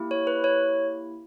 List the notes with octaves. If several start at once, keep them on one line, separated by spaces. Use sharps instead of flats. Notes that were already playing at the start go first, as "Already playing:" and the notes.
Already playing: A#3 E4 G4
C#5
B4
C#5